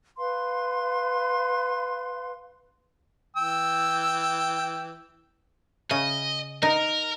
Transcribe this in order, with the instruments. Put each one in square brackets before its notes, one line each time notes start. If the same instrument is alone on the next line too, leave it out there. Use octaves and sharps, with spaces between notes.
[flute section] B4 F5 C6
[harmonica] E3 G5 E6
[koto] C#3 [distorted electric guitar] D#5
[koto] D#4 [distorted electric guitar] A#4